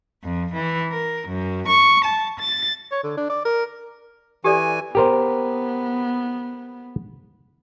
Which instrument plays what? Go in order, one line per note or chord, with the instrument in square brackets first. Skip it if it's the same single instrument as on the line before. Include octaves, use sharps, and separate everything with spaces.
[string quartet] F2
E3
A#4
F#2
C#6
A5
A6
[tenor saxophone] C#5
D3
D4
D5
A#4
[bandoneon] E3 G#5 [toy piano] G4 A4 D5
[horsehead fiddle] B3 [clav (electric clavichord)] G4 A#4 C5